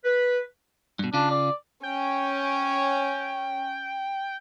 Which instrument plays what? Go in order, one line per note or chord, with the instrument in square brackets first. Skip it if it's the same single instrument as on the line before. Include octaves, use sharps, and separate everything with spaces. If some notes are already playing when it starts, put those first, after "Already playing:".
[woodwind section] B4
[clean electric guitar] G2 B2
[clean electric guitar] C#3 F4 [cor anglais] D4
[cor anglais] D5
[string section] C#4 [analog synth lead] G5